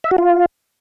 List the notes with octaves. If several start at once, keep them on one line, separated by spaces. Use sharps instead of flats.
E5
F#4
F4